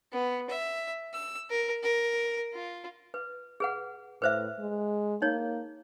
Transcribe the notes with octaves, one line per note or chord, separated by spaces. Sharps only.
B3
E5
E6
A#4
A#4
F4
B4
G#4 B4 F#5
A2 B4 C5 E5
G#3
A#3 D#4 C#5